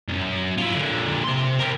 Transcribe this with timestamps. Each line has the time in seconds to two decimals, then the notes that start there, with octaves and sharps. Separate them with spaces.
0.08 C2 F#2
0.58 E4 F4
0.75 A#2 D3
1.24 C3 C6
1.60 G4 A#4